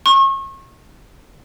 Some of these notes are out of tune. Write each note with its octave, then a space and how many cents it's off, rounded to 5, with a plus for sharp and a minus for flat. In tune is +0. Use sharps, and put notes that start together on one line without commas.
C#6 -35